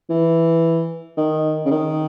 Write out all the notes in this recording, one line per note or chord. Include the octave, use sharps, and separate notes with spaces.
E3
D#3
C#3
D#3